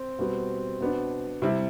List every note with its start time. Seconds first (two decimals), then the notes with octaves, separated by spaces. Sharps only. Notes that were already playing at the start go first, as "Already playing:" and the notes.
Already playing: C4
0.19 B2 G3 B3
0.80 B2 B3 D4
1.42 C3 G3 C4 E4